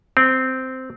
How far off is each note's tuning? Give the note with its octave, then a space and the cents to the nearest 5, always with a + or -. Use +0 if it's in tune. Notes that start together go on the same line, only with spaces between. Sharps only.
C4 -10